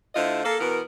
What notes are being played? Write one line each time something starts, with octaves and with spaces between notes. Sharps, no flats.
D3 A3 E4 F4 C5 D#5
A#3 A4
B2 E3 B3 A#4